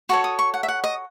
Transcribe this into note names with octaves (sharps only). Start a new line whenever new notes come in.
F#4 A4 C#5 C#6
D#6
C#6
F#5
E5
F#5
D#5